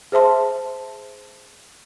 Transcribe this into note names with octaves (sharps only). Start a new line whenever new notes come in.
G#4 C5 E5 A5 C6